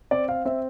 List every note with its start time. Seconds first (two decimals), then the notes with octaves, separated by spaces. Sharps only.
0.11 C4 D5
0.29 F5
0.45 C4 E5